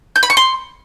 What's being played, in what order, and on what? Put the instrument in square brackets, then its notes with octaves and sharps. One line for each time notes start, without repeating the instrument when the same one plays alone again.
[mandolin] G6
B5
C#6
C6